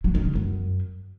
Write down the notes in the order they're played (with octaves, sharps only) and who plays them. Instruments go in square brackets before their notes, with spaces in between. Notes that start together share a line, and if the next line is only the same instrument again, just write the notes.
[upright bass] F#3
D#3
C#3
F#2